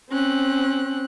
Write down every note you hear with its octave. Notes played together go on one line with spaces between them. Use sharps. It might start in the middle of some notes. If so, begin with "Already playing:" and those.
C4 C#4 F#6